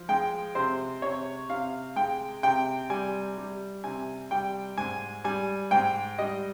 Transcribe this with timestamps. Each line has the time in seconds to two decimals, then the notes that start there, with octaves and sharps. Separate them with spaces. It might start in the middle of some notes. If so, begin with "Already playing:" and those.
Already playing: F3
0.09 G#3 G5
0.55 C3 C5
1.02 C3 C#5
1.50 C3 F5
1.96 G#3 G5
2.43 C3 G5
2.90 G3 G#5
3.38 G3
3.84 C3 G#5
4.31 G3 G5
4.78 G#2 G#5
5.24 G3 G#5
5.71 G#2 G5
6.18 G3 D#5